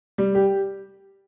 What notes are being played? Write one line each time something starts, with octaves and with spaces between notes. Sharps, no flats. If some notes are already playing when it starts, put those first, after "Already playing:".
G3
G4